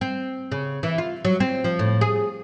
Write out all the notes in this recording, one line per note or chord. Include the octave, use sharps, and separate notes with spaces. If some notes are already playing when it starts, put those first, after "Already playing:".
C4
C#3
E3
F4
F#3
C4
F3
A2
G#4